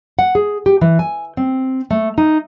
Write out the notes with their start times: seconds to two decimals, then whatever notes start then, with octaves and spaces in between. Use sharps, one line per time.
0.19 F#5
0.35 G#4
0.66 G4
0.81 E3
0.99 G#5
1.37 C4
1.91 A3
2.18 D#4